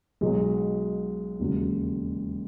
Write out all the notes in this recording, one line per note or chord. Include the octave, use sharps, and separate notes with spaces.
B1 B2 F#3 G#3
E1 D#2 C#3 F#3